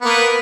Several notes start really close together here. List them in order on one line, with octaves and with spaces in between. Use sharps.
B3 A#3 B4